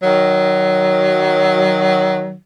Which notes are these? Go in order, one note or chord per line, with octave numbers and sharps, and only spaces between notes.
D#3 F#3